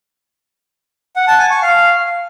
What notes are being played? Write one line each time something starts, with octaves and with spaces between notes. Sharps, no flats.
F#5
A5
G#5
C#6
F5